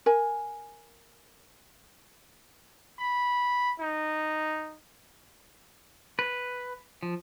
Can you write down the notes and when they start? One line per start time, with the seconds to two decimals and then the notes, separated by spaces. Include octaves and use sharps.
0.06 A#4 G#5
2.99 B5
3.80 D#4
6.19 B4
7.03 F3